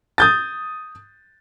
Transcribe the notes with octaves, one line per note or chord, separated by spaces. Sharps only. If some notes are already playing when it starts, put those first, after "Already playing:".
D#6 G6 A6